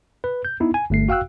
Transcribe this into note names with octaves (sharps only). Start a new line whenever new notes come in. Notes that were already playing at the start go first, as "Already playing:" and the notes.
B4
G6
B3 D#4 E4
G#5
G1 A3 C7
F#4 F5 G5 E6 F#6